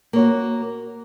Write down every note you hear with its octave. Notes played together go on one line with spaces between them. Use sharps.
A#3 F#4 C#5